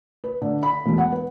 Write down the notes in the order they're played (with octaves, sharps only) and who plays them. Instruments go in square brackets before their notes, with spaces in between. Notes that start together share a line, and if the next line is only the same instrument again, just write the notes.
[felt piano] B4
D3
B5
E1
F#5
B4